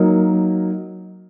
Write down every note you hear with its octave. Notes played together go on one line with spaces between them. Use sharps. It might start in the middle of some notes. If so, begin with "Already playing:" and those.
Already playing: F#3 A#3 D#4